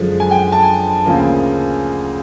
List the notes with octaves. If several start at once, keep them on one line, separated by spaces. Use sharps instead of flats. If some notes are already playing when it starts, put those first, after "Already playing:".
Already playing: F#2 D3 F3 G#3
G#5
G5
A5
G#5
D2 C#3 F3 A#3